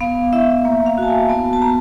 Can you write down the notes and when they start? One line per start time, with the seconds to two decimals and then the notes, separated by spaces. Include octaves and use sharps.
0.01 B3 F5
0.33 E4 E5
0.65 A#3 E5
0.86 F5
0.98 F#4 A5
1.08 G#5
1.30 B3 A5
1.53 A5
1.62 B3 A#5